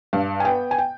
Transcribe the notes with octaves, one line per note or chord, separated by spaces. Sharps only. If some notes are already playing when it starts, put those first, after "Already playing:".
G2 F5
G#5
B3 G5
G#5
G5